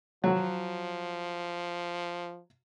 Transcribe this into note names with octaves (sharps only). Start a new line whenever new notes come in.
F3 F#3 F#4